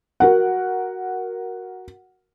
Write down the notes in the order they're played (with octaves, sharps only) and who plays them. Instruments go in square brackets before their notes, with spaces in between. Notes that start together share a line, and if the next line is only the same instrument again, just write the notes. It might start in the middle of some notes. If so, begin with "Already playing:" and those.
[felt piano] F#4 A#4 F#5